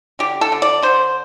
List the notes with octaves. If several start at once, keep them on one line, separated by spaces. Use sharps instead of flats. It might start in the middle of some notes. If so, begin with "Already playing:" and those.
D3 G4
A4
D3
D5
D3 C5